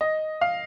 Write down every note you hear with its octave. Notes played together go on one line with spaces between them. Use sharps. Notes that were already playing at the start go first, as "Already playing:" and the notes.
D#5
F5